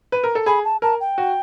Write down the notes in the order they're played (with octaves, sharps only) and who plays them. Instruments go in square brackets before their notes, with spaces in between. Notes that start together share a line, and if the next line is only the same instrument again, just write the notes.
[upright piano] B4
A#4
A4
[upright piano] G#4 [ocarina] B5
[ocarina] A5
[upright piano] A#4 [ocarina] A5
[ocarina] G5
[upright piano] F#4